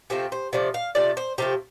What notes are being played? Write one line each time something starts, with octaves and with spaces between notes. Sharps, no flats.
C3 F3 A3 C4
C5
C3 F3 A3 D5
F5
C3 F3 A3 D5
C5
C3 F3 A3 G4